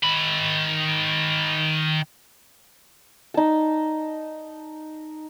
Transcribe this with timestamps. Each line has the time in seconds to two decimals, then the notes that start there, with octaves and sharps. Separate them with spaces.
0.03 D#3 B5
3.34 D#4 A5